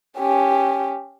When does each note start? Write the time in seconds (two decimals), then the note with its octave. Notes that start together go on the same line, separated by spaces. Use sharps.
0.18 C#4 G4